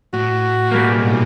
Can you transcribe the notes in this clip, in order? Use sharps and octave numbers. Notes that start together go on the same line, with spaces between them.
A2 F#4
G#2 B2 G3 G#3 A#3